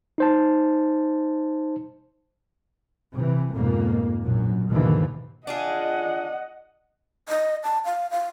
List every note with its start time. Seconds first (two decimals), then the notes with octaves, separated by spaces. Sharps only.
0.18 D#4 C5 A5
3.14 C3 E3
3.54 F2 G#2 B2 A#3
4.24 A#1 F#2 B2 F#3
4.68 D#2 G#2 B2 D3 E3 F3
5.47 D4 F4 G#4 D#5 F#5
7.29 D#5
7.64 A5
7.85 F5
8.11 F5